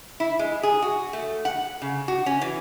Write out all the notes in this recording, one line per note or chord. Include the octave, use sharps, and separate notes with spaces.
E4
G#3
G#4
F#4
A3
F#5
C#3
F#4
C#4
E3